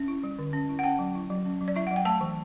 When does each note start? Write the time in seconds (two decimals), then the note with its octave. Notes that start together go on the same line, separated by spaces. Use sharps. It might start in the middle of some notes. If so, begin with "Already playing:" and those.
Already playing: C#4
0.08 E4
0.24 G3
0.39 D3
0.53 C#4
0.69 E4
0.79 F#5
0.84 C#4 G5
0.99 F#3
1.15 E4
1.30 F#3
1.45 C#4
1.61 F#3
1.68 D5
1.76 E4 E5
1.87 F#3 F#5
1.96 G5
2.05 A3 A5
2.21 E3